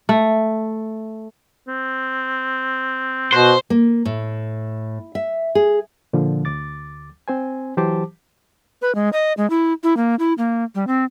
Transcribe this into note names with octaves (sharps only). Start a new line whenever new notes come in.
A3
C4
B2 F#4 C5
A#3
A2
E5
G#4
A#2 D3 F3
D2 D6 A6
C4 C5 G#5
E3 F#3 G4 C5 A5 D6
B4
G#3
D#5
G#3
E4
E4
A#3
E4
A#3
G3
C4